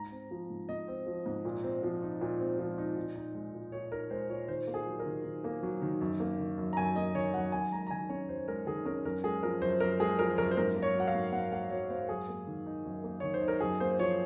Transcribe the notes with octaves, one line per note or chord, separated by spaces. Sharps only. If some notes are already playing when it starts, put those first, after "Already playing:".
Already playing: G#2 A#5
C4
F3
G#2
G#2 D#5
C4
F3
G#2
A#2
C4
F3
D#4
A#2
C4
F3
D#4
A#2
D#4
G#3
A#2
A#2 C#5
D#4 A#4
G#3 C5
A#2 C#5
D#3 C5
A#3
G#4
F#3
A#4
D#3
D#3
A#3
F#3
D#3
F#2
A#3
D#3
F#2
A#5
F#2 G#5
A#3 D#5
D#3 C#5
F#2 F#5
F#2 G#5
G#3 A#5
A#5
D#3 G#5
C#4 C#5
F#2 C5
G#3 A#4
D#3 G#4
C#4 A#4
F#2 A#4
G#3 G#4
F3 A#4
F#2 C5
F#2 A#4
G#3 G#4
F3 A#4
F#2 A#4
C5
G#2 A#4
A#3
C#5
F#3 F#5
F5
G#2
G#2 F#5
A#3 F#5
F#3 C#5
G#2 C5
F#2 G#4
A#3
D#3
D#4
F#2
A#3
D#3 C#5
C5
D#4
A#4
F#2 G#4
A#3 C5
F3 C#5